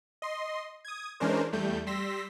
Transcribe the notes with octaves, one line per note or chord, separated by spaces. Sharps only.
D#5 C6
D#6 G#6
E3 G#3 C#4 D4 A#4 C5
E2 G3 A3 G6
G3 C6 E6 A#6 B6